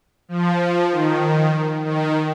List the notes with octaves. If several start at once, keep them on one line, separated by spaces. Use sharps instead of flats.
F3
D#3
D#3